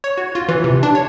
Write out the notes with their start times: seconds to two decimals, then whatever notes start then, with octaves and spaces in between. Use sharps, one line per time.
0.04 C#5
0.18 F#4
0.35 F4
0.49 E3
0.64 C3
0.83 D4
0.95 C#5